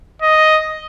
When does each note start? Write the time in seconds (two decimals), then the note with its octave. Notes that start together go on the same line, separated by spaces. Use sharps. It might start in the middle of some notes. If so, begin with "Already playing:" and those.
0.22 D#5